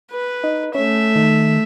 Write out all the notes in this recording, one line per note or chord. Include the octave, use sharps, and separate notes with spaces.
B4
D#4
A3 C#4 E5
D#3